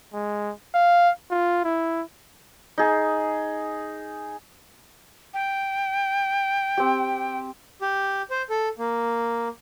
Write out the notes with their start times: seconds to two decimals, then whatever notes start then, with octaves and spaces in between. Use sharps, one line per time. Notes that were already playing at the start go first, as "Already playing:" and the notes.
0.14 G#3
0.75 F5
1.31 F4
1.65 E4
2.78 D#4 G#4
5.34 G5
6.77 C4 G4
7.81 G4
8.30 C5
8.50 A4
8.79 A#3